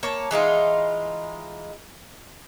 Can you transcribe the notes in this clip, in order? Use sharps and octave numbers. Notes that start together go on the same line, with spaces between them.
A#3 C#5 A5
E3 G#3 D#4 F4